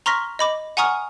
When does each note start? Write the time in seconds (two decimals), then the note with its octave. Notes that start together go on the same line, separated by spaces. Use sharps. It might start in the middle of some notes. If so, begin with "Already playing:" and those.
0.06 A#5 C6 C#6 F6 A#6 B6
0.39 D#5 B5 D6
0.77 F#5 G#5 A#5 C#6 D#6 F6